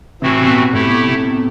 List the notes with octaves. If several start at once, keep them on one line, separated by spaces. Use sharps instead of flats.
A2 C3 E3 A3 C4 F#4
C3
B2
A2 A3 E4 G4
B2
C3